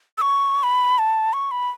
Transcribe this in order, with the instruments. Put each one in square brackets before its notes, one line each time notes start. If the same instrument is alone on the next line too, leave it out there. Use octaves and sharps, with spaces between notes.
[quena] E6
C#6
B5
A5
C#6
B5